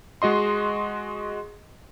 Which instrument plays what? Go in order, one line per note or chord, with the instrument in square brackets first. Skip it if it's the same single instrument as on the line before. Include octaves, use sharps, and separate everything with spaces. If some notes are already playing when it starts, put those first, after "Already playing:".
[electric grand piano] G#3 F#4 D#5 C6